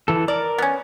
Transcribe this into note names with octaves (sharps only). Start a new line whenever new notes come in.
E3 A4
A#4 D5
B3 C#4